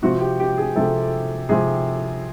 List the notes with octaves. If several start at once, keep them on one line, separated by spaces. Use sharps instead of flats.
C3 F3 F#4
G4
G4
G#4
C3 F3 A4
C3 F3 G#4